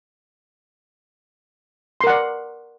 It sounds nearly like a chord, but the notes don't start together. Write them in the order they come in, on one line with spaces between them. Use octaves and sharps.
C6 A#4 F#5 D5